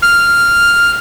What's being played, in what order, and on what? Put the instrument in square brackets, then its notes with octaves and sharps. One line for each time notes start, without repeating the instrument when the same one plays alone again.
[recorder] F6